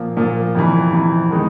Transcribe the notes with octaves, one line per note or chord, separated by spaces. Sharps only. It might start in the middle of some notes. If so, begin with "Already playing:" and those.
Already playing: A#2 F3 A#3
A#2 F3 A#3
F2 C3 E3
F2 C3 E3
D#3 G#3 B3 D#4